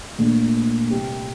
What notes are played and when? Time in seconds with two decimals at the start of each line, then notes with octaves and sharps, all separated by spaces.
0.18 A#2 A3 D4
0.90 C3 G3 C4